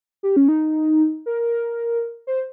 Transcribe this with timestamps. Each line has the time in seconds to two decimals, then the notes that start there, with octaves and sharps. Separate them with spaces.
0.23 G4
0.36 C#4
0.48 D#4
1.26 A#4
2.27 C5